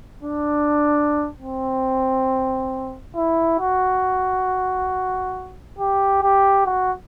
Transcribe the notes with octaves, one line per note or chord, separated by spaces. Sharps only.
D4
C4
E4
F#4
G4
G4
F#4